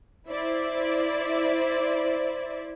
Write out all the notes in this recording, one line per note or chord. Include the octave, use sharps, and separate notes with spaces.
E4 C5 D5 E5